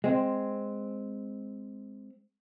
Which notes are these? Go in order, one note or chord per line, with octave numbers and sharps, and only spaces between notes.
G#3 C4